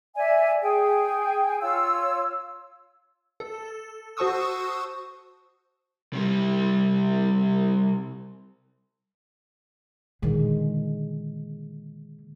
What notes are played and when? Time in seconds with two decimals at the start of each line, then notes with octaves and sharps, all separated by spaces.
0.15 D5 E5 G#5
0.62 G#4 G5
1.61 F4 C#5 E6
3.40 A4
4.17 F#4 C5 A5 C#6 D#6 E6
6.13 C3 G3
10.22 A#2 D3 D#3 G#3